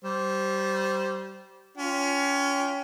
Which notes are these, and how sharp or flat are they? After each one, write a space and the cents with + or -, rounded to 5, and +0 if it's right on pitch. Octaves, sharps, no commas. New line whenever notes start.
G3 -20 C5 +0
C#4 +25 F4 +0 G5 +0